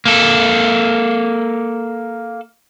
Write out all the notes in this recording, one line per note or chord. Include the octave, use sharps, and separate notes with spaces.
A#3 A4